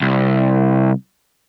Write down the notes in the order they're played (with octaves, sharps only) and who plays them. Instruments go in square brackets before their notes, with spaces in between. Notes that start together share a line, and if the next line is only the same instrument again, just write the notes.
[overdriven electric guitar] C2